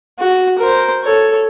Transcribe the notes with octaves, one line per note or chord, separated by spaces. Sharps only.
F#4
A#4 C5
A4 C#5